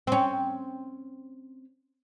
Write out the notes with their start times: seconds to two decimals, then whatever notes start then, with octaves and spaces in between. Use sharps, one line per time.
0.07 C4 C#4